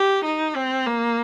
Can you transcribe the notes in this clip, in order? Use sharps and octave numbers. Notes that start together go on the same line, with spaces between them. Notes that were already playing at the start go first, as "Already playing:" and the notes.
Already playing: G4
D#4
C4
A#3